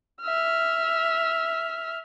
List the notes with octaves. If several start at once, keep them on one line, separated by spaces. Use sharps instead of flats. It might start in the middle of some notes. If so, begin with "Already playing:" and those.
E5 F6